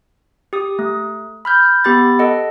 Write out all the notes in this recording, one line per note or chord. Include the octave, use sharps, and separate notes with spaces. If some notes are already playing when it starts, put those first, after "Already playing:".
G4 D#6
A3
B5 F6 G6
B3 G4 B5 A6
A4 D#5 F#5